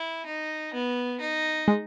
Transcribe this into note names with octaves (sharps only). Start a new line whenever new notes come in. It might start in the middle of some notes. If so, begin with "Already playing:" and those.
Already playing: E4
D#4
B3
D#4
G#3